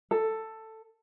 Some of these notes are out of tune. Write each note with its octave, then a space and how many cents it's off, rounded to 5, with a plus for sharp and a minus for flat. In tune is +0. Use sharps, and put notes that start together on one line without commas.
A4 +10